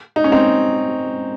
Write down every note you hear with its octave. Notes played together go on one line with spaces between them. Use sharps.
D#4
C#4
C4 D#4